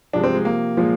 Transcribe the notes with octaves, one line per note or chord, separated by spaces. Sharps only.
C3 F3 G#3 D4
C4
G#3
A#3
A#2 F3 G#3